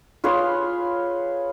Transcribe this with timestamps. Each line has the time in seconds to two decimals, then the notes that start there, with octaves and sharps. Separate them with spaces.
0.24 F4 G#4 B4 C#5